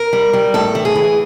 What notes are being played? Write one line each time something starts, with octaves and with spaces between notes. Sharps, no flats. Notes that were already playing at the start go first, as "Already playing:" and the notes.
Already playing: A#4
G3
G3
A2 A4
E3
G#4
E3